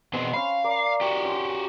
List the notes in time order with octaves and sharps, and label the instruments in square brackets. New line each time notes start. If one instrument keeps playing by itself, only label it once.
[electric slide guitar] B2 B3 G#4 [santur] C4 C5
[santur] C#4 G5 B5 [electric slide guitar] F5
[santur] A#4 D5
[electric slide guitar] F#4 G4
[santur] C#4 F4